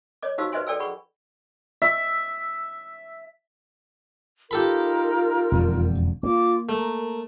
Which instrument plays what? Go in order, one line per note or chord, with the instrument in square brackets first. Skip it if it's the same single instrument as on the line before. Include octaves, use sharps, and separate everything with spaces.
[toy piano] C#5 D#5 D6
D#4 F#4 G4 C5 F5 E6
B4 C5 D#5 E5 G#5 C6
A4 D5 G5 G#5 E6
G#4 F#5 B5 C#6
[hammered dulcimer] E5
[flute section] D#4 F4 A#4 [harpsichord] G4 A4 B5
[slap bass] E1 F2 D3
[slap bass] A#3 [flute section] F4 D6
[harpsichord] A3 [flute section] A#4